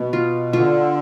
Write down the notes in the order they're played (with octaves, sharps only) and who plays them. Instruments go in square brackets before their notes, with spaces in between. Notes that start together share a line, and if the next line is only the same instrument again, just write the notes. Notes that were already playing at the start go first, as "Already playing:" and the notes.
Already playing: [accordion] B2 [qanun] B3
[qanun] F4
[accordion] D3 [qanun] F4